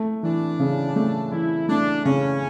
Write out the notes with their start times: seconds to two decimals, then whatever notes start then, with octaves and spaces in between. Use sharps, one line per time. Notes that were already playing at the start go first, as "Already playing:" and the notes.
Already playing: A3
0.23 E3 D4
0.59 C#3
0.96 A3
1.32 E3 E4
1.69 A3 D4
2.05 C#3 C#4